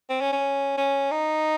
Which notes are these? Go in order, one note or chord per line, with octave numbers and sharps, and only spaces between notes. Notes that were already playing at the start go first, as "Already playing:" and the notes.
C4
C#4
C#4
C#4
D#4